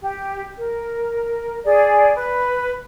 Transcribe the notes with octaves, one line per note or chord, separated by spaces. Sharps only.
G4
A#4
G#4 D5
B4